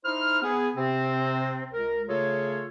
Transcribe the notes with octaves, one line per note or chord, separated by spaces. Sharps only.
D#4 E4 C5 F6
B3 G#4
C3 C4
C#2 A#4
C#3 A3 F4 G#4 A4 C#5